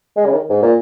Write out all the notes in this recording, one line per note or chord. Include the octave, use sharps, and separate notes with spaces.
G#3
C#3
D#3
G#2
A#2